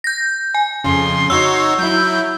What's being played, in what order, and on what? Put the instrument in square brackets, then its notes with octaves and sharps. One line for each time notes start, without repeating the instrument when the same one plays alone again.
[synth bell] G6 A#6
G#5
[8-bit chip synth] F2 C#3 [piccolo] C6
[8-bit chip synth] D#4 F#4 C#5 [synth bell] E6
[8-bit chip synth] F#3 E4 [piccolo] G6